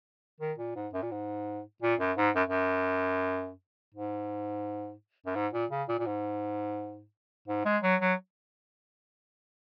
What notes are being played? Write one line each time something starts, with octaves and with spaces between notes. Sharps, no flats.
D#3
A#2
G#2
F#2
A#2
G#2
A#2
F#2
G#2
F#2
F#2
G#2
F#2
G#2
A#2
C#3
A#2
A#2
G#2
G#2
G#3
F#3
F#3